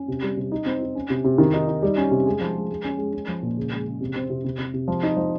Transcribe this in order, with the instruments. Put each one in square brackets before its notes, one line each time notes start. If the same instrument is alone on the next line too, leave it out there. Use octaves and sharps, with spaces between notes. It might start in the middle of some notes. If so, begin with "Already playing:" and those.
Already playing: [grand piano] C#4
C3
G3
C3
D#4
C4
D#4
C#4
C3
C3
D#3
D#4
D#4
G3
C#4
C3
G#3
F3
G#3
G#3
C#4
G#3
C#4
F3
A#2
C#3
G#3
C#3
C3
C4
C3
C3
C3
C3
F3
D#4
F3